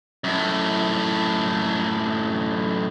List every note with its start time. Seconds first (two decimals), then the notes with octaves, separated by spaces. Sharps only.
0.24 F#2 A2